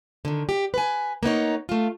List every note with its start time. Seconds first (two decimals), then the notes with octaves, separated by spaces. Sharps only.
0.25 D3 D#3
0.49 G4
0.74 B4 G#5
1.23 A#3 B3 D#4 C#5
1.69 A3 F4